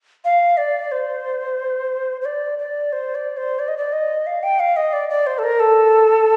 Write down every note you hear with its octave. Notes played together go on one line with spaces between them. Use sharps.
F5
D5
C5
C5
D5
D5
C5
D5
C5
D5
D#5
D5
D#5
F5
G5
F5
D#5
D5
D5
C5
A4
A#4
A4